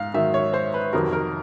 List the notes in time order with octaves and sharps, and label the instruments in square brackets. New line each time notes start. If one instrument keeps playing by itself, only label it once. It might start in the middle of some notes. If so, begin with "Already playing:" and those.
Already playing: [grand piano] G#2 F5
G#2 D#3 F#3 E5
C#5
C5
B4
F2 C3 D#3 F#3 A#4
A#4